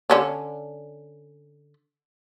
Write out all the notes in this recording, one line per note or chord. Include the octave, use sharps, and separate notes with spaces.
D3 C#4 D4